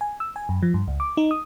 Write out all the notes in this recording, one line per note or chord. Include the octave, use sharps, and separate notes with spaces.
G#5
E6
G#5
F#2
F3
G2
C#2
D6
D#4
D#6